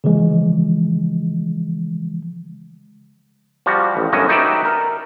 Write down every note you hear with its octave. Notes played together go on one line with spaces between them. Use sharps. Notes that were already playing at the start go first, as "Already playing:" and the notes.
C#3 E3 F3 G#3
F3 G3 F#4
A1
G1 F#2 A2 C#4 F#4 D#5
D#4 F#4 B4 D5 E5 G5
A#4